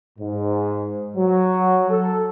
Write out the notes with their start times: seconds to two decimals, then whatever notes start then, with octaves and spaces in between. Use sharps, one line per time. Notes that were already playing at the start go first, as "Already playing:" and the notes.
0.19 G#2
1.16 F#3
1.90 A4